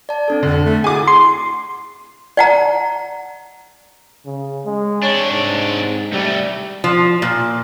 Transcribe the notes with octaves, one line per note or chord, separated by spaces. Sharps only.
D5 A5
C4 D4 A4
F2 D3
A3
E4 G#4 F#5 G#5 D6
C6
D5 F#5 A#5
C#3
G#3
C3 D4 C#5
G#2
C2 G3 A3
F3
A#2